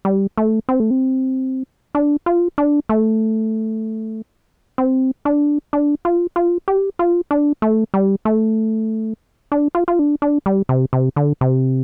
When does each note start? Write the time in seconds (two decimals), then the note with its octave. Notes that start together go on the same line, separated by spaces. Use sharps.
0.05 G3
0.38 A3
0.69 C4
0.80 A3
0.91 C4
1.95 D4
2.26 F4
2.58 D4
2.89 A3
4.78 C4
5.25 D4
5.73 D4
6.05 F4
6.36 F4
6.68 G4
6.99 F4
7.31 D4
7.62 A3
7.94 G3
8.25 A3
9.52 D4
9.75 F4
9.88 F4
9.99 D4
10.22 D4
10.46 G3
10.69 C3
10.93 C3
11.16 D3
11.41 C3